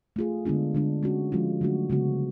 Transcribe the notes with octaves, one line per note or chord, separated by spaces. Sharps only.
A3 F4 G#4
D3 G#3 B3 D4 F4
D3 G#3 D4
G#3 C#4 F#4
F3 G#3 C#4 F4
D3 F#3 A3 D4 F#4
C#3 G#3 B3 F#4